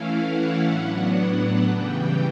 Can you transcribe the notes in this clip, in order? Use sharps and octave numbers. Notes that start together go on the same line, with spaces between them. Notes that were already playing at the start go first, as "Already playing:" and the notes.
Already playing: E3 A3 C#4 E4 F5
F#5
A2 F#3 B3 D4
C#3 E3 G3 G5